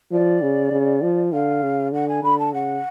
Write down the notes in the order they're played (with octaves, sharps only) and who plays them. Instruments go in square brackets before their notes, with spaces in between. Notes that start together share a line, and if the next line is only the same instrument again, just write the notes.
[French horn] F3 [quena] D5
[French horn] C#3
C#3
F3
[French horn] D3 [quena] F5
[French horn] C#3
[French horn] D3 [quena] F#5
[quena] G#5
[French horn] D3 [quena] B5
[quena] A5
[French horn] C#3 [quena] F#5